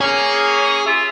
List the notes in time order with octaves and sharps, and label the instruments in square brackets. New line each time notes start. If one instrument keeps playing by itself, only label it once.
[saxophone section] A#3 C#4 [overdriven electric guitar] G#4
[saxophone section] F4 E5